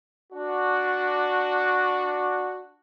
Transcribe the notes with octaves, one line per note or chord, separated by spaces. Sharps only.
D4 F#4